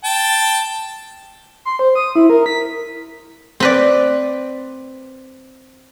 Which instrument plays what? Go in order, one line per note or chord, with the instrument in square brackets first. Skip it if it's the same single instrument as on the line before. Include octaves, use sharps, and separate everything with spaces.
[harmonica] G5 A5
[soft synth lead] C6
C5
D#6
E4
A#4
B6
[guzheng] C4 B4 D5